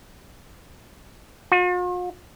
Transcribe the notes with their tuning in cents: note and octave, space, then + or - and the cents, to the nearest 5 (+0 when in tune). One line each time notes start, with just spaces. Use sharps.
F4 +45